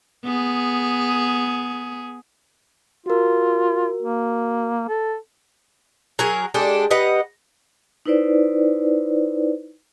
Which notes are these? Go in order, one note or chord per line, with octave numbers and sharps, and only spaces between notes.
B3 G#4
F4 F#4 A#4
A#3
A4
F#3 G#4 A#4
G#3 D4 G4 A4
G3 B4 D#5 F#5
D#4 E4 B4 C5 D5